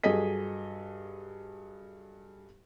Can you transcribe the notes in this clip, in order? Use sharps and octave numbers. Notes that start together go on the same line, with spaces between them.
G2 F#3 G#4 A4 D#5 B6